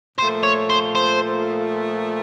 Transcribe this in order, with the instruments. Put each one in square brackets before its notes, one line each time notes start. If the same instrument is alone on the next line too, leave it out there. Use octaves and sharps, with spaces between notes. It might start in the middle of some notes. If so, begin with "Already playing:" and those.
[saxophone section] A#2 F3 A3 [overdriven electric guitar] C5
[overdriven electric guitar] C#5
C5
C5